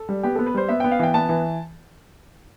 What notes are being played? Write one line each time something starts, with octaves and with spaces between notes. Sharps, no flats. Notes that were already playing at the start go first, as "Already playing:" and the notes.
Already playing: A4
G3
B3 G4
B3 A4
B4
G3 C5
B3 E5
B3 G5
F5
E3 G5
B3 A5
E3